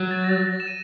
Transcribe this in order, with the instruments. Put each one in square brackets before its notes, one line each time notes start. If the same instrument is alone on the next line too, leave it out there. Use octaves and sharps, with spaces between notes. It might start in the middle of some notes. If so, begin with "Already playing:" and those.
Already playing: [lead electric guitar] F#3
[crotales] A6
A#6
A6
A6
A#6
E7
D#7